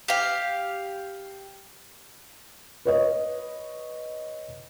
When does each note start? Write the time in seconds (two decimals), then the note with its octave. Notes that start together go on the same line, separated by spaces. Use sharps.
0.08 G4 F5
2.85 B4 C#5 D#5